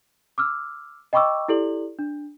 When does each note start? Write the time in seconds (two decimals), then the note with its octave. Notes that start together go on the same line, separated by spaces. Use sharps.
0.38 D6 E6 F6
1.13 D#5 G5 B5 C#6 D6 E6
1.48 E4 G4 A4 D5 F#7
1.99 D4